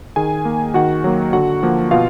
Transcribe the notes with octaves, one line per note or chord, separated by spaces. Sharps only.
D#3 G#4 G#5
A#3
D#3 F#4 F#5
F#3 A#3
D3 F#4 F#5
F3 A#3
B2 F4 F5